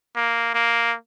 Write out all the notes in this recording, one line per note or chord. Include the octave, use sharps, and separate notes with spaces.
A#3
A#3